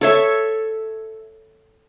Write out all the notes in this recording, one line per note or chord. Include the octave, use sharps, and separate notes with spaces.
A4 C#5 E5